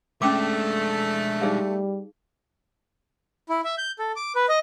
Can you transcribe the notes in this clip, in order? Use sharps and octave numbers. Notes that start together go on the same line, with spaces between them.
G#3 A3 C#4 D4 G5 D6
G3 D#4 G#4 F5
E4
E5
G6
A4
D6
B4
D#5